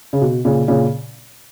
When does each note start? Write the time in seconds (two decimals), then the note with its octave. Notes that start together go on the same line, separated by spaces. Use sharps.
0.13 C#3
0.22 B2
0.45 A#2 C#3
0.68 A#2 C#3